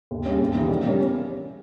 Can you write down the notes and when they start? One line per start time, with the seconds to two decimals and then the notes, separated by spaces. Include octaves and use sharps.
0.11 D#2
0.25 C#3 G3 C#4 G4
0.40 D#2
0.54 C#3 E3 A#3 D#4
0.69 A#1
0.84 A#2 G3 A#3 C#4